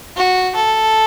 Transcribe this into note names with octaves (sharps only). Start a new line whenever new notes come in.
F#4
A4